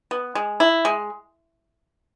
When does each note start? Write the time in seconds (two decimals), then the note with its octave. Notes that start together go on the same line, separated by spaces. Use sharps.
0.11 B3
0.35 G#3
0.60 E4
0.85 G#3